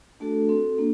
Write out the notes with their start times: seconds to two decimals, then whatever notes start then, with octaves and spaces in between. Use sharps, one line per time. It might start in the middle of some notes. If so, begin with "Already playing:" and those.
0.20 A3 D4 F#4 A4
0.49 C4 F#4 A4
0.78 A#3 D4